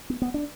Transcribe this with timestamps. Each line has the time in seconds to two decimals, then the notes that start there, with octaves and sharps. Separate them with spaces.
0.10 B3
0.22 B3
0.34 D4